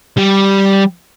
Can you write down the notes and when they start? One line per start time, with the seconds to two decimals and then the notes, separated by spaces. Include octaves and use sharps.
0.17 G3